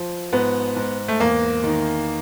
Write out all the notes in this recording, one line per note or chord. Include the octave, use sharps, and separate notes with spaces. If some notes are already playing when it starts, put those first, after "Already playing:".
Already playing: F3
G#2 B3
G#2
A3
E2 A#3
D#3